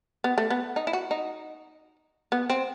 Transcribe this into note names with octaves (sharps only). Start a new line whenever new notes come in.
B3
A3
B3
D#4
E4
F#4
D#4
B3
C4